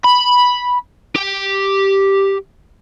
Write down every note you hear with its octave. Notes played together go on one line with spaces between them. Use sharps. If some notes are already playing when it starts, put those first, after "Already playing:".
B5
G4